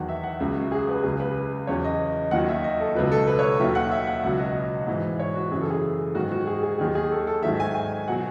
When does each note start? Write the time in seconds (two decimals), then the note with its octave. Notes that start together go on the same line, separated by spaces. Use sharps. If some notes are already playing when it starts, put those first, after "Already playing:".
Already playing: E2 D#3 F#3 F#5
0.09 E5
0.24 F#5
0.40 C#2 C#3 F#3 E5
0.57 F#4
0.72 G#4
0.89 B4
1.03 C#2 C#3 F#3 G#4
1.20 B4
1.67 E2 C#3 F#3 C#5
1.84 D#5
2.31 D#2 D#3 F#3 F#5
2.48 E5
2.64 D#5
2.80 A4
2.95 C#2 B2 F#3 B4
3.12 A4
3.27 B4
3.39 C#5
3.60 D#2 D#3 F#3 E5
3.75 F#5
3.91 E5
4.07 F#5
4.24 C#2 B2 F#3 F#5
4.39 D#5
4.87 G#2 E3
5.19 C#5
5.35 F#4
5.51 F#2 C#3 E3 G#4
5.61 A4
5.70 G#4
6.15 G#2 D#3 F#3 F#4
6.32 F#4
6.47 G#4
6.63 G#4
6.79 D#2 D#3 F#3 G#4
6.95 G#4
7.12 A4
7.27 A4
7.43 G#2 D#3 F#3 E5
7.60 G#5
7.75 G#5
8.08 B2 F#3 F#5